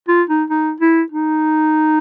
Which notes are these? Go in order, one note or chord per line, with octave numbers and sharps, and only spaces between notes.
F4
D#4
D#4
E4
D#4